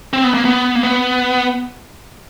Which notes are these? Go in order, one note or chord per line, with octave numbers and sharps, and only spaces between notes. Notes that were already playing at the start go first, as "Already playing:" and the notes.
C4
B3
A#3
B3
A#3
B3